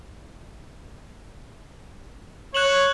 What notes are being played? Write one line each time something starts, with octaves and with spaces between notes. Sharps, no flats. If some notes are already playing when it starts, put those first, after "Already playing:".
C#5 F#6 E7 F#7